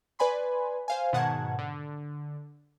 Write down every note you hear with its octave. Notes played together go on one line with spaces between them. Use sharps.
B4 D5 G#5 B5 C6
C5 F5 G#5
G#2 B2 D#3 F#5 A5 G#6
D3